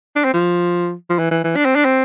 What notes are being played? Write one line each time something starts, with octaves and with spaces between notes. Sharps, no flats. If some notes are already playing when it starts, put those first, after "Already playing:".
D4
C4
F3
F3
E3
E3
E3
D4
C4
D4
C4